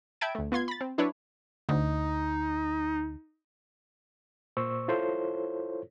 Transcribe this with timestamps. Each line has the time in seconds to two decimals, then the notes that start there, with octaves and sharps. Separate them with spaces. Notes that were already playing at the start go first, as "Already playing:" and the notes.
0.21 E5 G5 A5 B5 G#6 D7
0.35 D2 A3
0.52 B3 F4 C6 G#6
0.68 B5 A6
0.81 C4
0.98 F#3 D4 E4 B4 C#5
1.69 D2 D#4
4.57 A#2 C5 C#6 E6
4.88 E4 F4 A4 C5 C#5